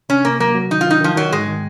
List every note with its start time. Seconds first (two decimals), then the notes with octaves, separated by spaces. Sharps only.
0.09 C3 C#4
0.25 C3 A#3
0.40 F#3 A#3
0.55 F#3
0.71 D#3 D#4
0.81 F4
0.87 D#3 D#4
1.01 D#3 F3
1.16 D#3 F#3
1.31 G#2 G#3
1.48 D#3